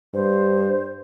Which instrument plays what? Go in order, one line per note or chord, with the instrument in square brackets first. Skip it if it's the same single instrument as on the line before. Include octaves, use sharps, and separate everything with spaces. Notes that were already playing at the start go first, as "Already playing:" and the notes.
[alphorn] G2 [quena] C5